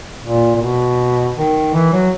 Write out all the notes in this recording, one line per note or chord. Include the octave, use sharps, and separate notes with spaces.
A#2
A#2
B2
D#3
E3
F#3